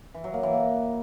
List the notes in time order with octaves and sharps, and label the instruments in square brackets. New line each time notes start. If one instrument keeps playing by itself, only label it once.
[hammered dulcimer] E3
F#3
A#3
E3
A#3